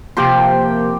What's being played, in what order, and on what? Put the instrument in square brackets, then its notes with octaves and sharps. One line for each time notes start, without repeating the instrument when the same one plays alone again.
[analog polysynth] C3 F3 A#3 [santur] G4 G5 C6